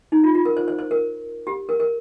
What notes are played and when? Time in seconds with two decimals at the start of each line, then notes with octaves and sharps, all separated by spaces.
0.12 D#4
0.24 F4
0.35 F4
0.45 A#4
0.57 C5
0.68 C5
0.79 C5
0.91 A#4
1.47 G4
1.69 A#4
1.80 A#4